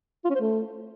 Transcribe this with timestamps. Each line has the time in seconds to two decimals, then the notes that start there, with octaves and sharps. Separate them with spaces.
0.25 F4
0.30 C#4
0.35 C5
0.40 A3